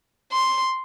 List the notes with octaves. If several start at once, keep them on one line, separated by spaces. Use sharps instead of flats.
C6